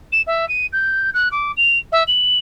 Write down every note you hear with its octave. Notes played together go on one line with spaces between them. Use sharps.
E7
E5
D#7
G6
F#6
D6
F7
E5
F#7